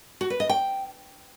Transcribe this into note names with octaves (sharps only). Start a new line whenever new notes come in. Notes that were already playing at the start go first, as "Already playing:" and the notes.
F#4
B4
D#5
G5